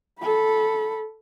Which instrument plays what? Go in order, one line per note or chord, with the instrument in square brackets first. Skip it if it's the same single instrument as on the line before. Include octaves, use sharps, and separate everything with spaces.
[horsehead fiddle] A4 B5